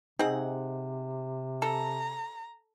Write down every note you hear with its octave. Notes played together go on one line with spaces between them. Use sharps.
C3 C4 D#4 G#4 F#5
A4 A#5